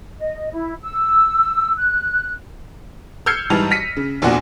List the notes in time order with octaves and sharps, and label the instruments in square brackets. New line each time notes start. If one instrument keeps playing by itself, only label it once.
[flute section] D#5
E4
E6
F#6
[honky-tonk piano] E6 F6 G6 G#6 C7 C#7
G#2 E3 G3 A5 F7
F6 A#6 B6 C#7 D#7
C#3
F1 E2 A#2 D4 F#4